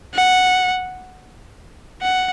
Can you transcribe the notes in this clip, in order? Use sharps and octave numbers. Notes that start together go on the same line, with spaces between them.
F#5
F#5